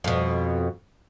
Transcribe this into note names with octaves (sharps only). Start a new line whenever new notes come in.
F2 B2